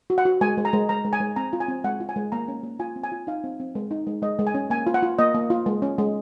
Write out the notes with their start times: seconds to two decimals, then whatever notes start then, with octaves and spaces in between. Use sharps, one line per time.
0.10 F#4
0.18 F#5
0.25 F#4
0.41 G#3 G#5
0.58 G#3
0.65 A#5
0.73 G#3
0.89 G#3 A#5
1.04 G#3
1.13 G#5
1.20 G#3
1.36 C4 A#5
1.53 F4
1.60 G#5
1.68 C4
1.84 G#3 F#5
2.00 F4
2.09 G#5
2.16 G#3
2.32 A#3 A#5
2.48 C#4
2.63 A#3
2.79 F4 G#5
2.96 C4
3.04 G#5
3.12 F4
3.27 D#4 F5
3.44 C4
3.60 C4
3.75 G#3
3.91 D#4
4.07 G#3
4.22 G#3 D#5
4.39 G#3
4.47 G#5
4.54 C#4
4.70 A#3 G#5
4.87 F4
4.94 F#5
5.03 F4
5.18 A#3 D#5
5.35 A#3
5.50 F4
5.66 G#3
5.82 C#4
5.98 G#3